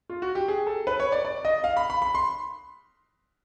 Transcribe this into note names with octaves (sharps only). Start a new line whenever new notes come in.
F4
F#4
G4
G#4
A4
B4
C#5
D5
D5
D#5
F5
B5
B5
B5
C6